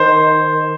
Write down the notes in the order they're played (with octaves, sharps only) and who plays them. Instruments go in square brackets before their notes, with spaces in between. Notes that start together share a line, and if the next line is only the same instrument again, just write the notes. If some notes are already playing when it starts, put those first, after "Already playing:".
Already playing: [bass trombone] D#3 [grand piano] C5